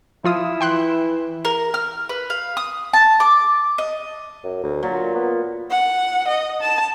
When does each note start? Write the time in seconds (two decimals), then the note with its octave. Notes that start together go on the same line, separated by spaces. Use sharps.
0.24 F3 E4 F4 D#6
0.61 E3 G5 C6 F#6
1.45 A#4
1.74 F6
2.09 B4
2.30 F5
2.57 D#6
2.93 A5
3.20 D6
3.78 D#5
4.44 F#2
4.63 D2
4.83 A#2 F#3
5.15 B3
5.71 F#5
6.28 D#5
6.61 A5